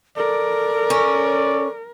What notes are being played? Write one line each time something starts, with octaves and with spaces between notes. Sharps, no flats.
A4 A#4 D5
C#4